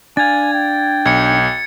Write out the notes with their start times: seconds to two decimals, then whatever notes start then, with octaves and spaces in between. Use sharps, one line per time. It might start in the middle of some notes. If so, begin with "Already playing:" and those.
0.17 D4 F5 G#5 G#6 A6
0.53 G5
1.06 B1 G#6 C#7